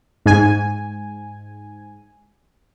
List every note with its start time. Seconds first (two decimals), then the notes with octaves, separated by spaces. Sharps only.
0.26 G#2 G#5